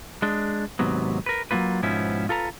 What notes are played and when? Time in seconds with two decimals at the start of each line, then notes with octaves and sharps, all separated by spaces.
0.22 G#3 D4
0.79 D#2 G#2 C3 F#3 B3
1.26 A#4 B4
1.51 F#3 G#3 A#3 F4 B4
1.83 G#2 B2 F3 B3 C#4 E4
2.29 F4 A4 B4 A#5